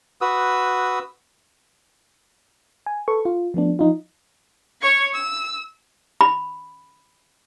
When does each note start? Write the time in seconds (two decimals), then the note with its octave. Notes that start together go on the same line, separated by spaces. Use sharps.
0.21 F#4 B4 D#6 E6
2.86 G#5
3.08 A4 B4 C#6
3.25 F4
3.54 F3 A3 B3 D4
3.79 F3 D#4 F4
4.82 C#5 C#6
5.15 E6
6.21 B5